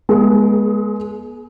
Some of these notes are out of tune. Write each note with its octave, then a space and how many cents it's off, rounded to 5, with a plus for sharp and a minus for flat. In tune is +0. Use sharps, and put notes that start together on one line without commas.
G#3 +0 B3 -35 G#4 +40